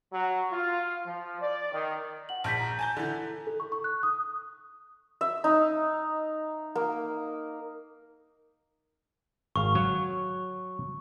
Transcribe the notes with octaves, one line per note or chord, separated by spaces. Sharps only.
F#3
F4
F3
D5
D#3
F#5 F#7
A#1 A5 G6 B6
A#5 B6
G#5 A5 G6
D3 E3
A4
C#6
C#6
F#6
D#6
E5
D#4
A#3
G#1 F5 C#6
F#3 C#5